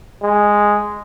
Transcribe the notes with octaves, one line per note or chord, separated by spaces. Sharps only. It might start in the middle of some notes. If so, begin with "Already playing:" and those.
G#3